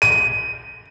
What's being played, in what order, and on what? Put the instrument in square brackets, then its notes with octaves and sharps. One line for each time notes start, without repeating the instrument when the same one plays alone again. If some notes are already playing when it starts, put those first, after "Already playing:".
[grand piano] D#7